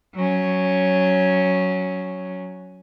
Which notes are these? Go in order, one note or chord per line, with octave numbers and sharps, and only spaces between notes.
F#3 C#4